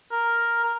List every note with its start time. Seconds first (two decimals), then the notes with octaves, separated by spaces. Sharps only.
0.11 A#4
0.63 A#4